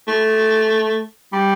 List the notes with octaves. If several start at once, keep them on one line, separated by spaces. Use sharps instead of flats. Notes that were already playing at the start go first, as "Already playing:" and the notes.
A3
G3